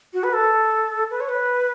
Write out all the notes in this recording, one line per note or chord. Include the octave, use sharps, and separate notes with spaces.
F#4
B4
A4
B4
C#5
B4